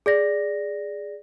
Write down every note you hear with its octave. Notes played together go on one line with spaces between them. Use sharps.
G#4 D5 A#6